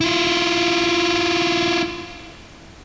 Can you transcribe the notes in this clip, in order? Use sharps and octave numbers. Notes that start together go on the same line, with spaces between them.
E4 F4